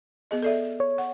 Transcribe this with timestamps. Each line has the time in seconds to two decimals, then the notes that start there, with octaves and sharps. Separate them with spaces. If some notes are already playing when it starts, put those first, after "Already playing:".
0.31 B3 G#4 D#5
0.42 A4 D5 E5
0.80 C#5
0.98 F#5